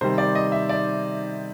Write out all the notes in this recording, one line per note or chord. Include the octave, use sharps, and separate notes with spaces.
C3 D#3 G3 C5
D5
D#5
E5
D5